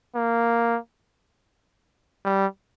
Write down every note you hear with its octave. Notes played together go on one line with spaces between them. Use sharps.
A#3
G3